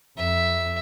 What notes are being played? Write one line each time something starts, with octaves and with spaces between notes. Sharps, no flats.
F2 E5